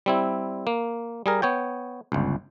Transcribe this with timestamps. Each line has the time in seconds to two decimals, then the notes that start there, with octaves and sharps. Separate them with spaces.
0.06 G3 C4 E4
0.67 A#3
1.26 G3 G#4 A#4
1.42 B3 C#5 G5
2.12 G1 C#2